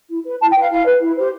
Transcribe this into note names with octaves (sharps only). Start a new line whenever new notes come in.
E4
B4
E4 A5
G5
B4 F5
E4 F5
B4
E4
G4 C5